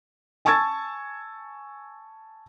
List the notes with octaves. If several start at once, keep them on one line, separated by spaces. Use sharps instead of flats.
G#5 A5 C#6 E6 G#6 A6